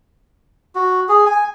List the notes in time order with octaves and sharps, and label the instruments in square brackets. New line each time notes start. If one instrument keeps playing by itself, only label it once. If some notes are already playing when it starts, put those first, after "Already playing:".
[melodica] F#4
G#4
G#5